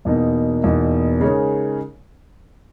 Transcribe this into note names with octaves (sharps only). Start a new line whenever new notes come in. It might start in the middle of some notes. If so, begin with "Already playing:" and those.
E2 B2 A#3 D#4
E2 B2 A#3 D#4
C#3 G#3 D#4 A#4 C#5